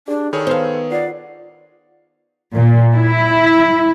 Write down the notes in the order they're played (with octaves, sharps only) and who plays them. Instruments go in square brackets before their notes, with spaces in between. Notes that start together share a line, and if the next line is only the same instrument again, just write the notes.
[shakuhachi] D4 [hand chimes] G4 G#4 D5
[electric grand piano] D#3 G#4 C#5 [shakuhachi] A4 [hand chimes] B5
[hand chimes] B3 B4 [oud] C5 F5
[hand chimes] F4 F#5 C7 [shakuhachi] D5
[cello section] A#2
E4